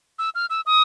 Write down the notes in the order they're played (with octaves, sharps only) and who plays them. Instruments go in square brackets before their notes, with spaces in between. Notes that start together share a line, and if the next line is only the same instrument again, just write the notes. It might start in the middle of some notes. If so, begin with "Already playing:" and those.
[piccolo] E6
F6
E6
D#6